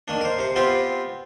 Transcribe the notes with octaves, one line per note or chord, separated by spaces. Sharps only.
D#3 A#3 D4
A#4 C5
C3 C5
B3 C4 F4 G4 C5